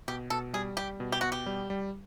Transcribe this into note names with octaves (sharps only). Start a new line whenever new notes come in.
B2 G4
B2 A4
G3 G#4
G3 G4
B2
G4
B2 F#4
G4
G3
G3